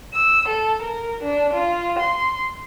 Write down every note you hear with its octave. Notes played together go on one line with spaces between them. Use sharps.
E6
A4
A#4
D4
F4
C6